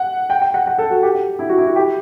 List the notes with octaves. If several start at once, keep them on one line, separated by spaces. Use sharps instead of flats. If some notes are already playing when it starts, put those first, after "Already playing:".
Already playing: F#5
G5
G5
F#5
F#5
A4
F#4
G4
G4
E4
F#4
E4
F#4
G4